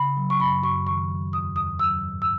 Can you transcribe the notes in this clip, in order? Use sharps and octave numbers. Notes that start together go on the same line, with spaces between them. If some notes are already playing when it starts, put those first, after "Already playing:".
Already playing: C#3 B5
F#3
C#6
F#2 B5
F#2 C#6
D#3 C#6
F#3
E2 D#6
E2 D#6
F#3 E6
G#2
E6